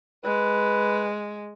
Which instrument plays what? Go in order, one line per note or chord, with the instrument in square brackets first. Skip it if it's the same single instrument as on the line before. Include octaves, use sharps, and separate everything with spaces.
[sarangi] G#3 [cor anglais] B4